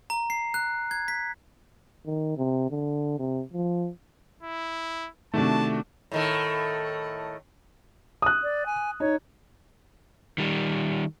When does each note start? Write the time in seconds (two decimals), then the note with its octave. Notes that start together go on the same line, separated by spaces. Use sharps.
0.10 A#5
0.30 C7
0.54 F#6
0.91 G#6
1.08 B6
2.06 D#3
2.37 C3
2.71 D3
3.18 C3
3.53 F3
4.43 E4
5.34 C3 D#3 A3 D4 F#4 A5
6.12 A2 D#3 A3
8.22 D#6 F#6
8.43 D5
8.66 G#5
9.00 D#4 C#5
10.38 D#3 G3